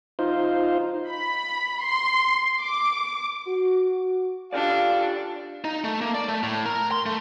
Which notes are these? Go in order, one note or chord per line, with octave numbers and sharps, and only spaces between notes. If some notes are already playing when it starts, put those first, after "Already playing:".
D#4 F4 C5
B5
C6
D6
F#4
D4 F4 G4 A4 D5 F5
D#4
A3
A#3
D5
A3
A2
A#4
C6
A3